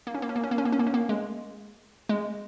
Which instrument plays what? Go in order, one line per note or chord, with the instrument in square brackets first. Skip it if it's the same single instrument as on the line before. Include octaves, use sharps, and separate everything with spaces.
[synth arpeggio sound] A#3
C#4
A#3
C#4
A#3
C#4
A#3
C#4
A#3
C#4
A#3
C#4
A#3
G#3
G#3